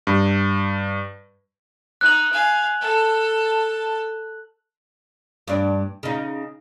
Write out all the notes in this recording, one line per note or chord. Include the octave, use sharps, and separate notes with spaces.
G2
D#4 F#6 F#7
F5 G#5
A4 A5
G2 D4
C#3 D#4